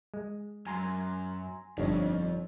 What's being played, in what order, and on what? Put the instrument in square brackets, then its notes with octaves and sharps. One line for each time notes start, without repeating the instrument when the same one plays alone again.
[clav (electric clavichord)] G#3
[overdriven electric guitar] F#2 [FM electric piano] G#5 A#5 C6
[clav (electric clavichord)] G1 [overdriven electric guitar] F2 [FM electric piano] D4 D#4 C#5